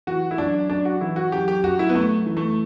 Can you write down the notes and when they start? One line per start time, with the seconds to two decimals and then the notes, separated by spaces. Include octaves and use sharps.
0.07 E3 F#4
0.31 E4
0.38 F#2 D4
0.70 F#2 D4
0.85 F#4
1.01 E3 E4
1.16 F#4
1.32 F#2 G4
1.48 G4
1.64 F#2 F#4
1.79 E4
1.89 B3
1.95 F#2 A3
2.26 E3
2.37 A3